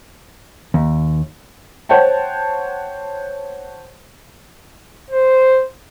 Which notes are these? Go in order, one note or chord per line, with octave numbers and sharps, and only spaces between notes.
D#2
C5 C#5 F#5 G5 A5
C5